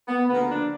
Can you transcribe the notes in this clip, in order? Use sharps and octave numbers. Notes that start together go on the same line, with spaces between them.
B3
D2 C#3 F3 A#3 B3
D4